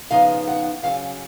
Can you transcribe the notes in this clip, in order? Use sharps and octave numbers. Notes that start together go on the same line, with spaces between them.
C#3 F3 B3 D#4 F5
F#5
C#3 F#3 C#4 F5